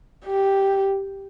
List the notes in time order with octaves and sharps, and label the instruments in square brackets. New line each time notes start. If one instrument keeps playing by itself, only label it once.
[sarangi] G4